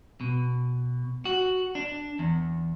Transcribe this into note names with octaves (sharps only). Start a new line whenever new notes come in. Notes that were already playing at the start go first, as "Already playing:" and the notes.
B2
F#4
D4
E2